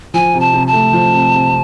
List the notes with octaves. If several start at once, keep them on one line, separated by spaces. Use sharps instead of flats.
F3 G#5
C3
A5
C3
A5
A3
F3
C3
C3